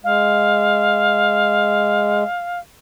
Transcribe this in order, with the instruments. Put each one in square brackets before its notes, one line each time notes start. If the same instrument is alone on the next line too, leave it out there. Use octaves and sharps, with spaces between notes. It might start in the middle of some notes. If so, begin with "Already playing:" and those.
[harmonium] G#3 [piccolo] F5